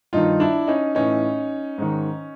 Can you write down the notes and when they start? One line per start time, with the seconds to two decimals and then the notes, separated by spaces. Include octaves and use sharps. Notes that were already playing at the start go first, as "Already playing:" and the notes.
0.13 G2 D#3 D#4 F4
0.40 D4 E4
0.67 C#4 D#4
0.95 A2 E3 C#4 D#4
1.78 G#2 D#3